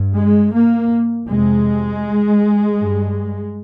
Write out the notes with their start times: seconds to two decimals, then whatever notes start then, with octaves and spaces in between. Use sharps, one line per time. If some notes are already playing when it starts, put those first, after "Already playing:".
Already playing: G2
0.16 G#3
0.53 A#3
1.27 F2 C3 G#3
2.75 G2